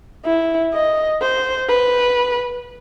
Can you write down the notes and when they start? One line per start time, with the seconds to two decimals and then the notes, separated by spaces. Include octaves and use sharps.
0.25 E4
0.74 D#5
1.22 C5
1.69 B4